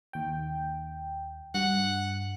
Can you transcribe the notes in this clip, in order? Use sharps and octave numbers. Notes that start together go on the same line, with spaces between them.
D#2 G5
G2 F#5